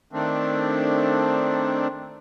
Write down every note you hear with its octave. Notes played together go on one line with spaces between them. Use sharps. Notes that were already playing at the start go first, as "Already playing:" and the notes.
D#3 A3 C4 D4